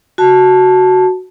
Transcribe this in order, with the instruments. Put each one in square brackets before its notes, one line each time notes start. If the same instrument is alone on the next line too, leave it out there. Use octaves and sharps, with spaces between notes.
[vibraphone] F#4 A5